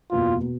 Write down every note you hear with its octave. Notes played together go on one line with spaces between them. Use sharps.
F#1 E2 B2 F4
B2